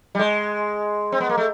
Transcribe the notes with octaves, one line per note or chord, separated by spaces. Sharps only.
G3
G#3
C4
B3
A#3
A3